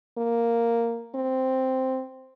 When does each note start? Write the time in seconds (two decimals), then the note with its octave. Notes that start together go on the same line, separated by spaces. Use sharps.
0.18 A#3
1.15 C4